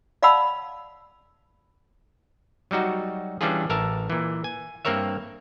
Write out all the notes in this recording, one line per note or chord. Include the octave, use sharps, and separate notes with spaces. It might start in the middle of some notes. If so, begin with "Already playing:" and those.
D5 F5 F#5 A5 B5 E6
F#3 G3 D#4 F#4
E3 G3 C#4 D4 F4 G#4
A1 A#4 E5 A5
A#2 E3
G#5
G2 A#3 C4 A#4 C#5 E5